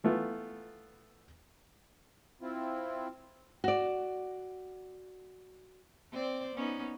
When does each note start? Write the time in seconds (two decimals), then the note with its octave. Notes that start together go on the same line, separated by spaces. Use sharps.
0.04 E3 A3 B3 F4
2.42 C4 E4 F4
3.64 F#4 D5
6.12 C4 C5 D5
6.55 B3 C#4 D#4